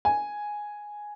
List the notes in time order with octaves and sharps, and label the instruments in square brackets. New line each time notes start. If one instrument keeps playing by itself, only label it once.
[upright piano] G#5